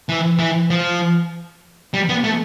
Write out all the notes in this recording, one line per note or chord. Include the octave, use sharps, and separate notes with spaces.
E3
E3
F3
G3
B3
A3